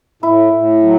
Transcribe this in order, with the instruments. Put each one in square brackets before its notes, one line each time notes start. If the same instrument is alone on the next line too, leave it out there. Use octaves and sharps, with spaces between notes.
[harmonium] A2 [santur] E4
[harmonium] A2
F#3